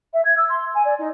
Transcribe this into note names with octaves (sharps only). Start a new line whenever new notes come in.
E5
G#6
E6
C6
G#5
D5
D#4